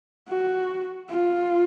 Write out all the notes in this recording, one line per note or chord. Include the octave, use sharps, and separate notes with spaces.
F#4
F4